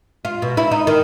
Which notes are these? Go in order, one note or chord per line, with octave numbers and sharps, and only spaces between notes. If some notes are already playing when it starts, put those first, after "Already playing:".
F4
B2
E4
D#4
D#3